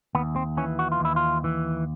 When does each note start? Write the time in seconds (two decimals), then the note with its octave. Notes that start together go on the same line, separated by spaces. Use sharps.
0.15 D#2 B3
0.36 C4
0.57 E3 C#4
0.79 F#4
0.92 F4
1.00 D#2 E4
1.16 F4
1.44 E3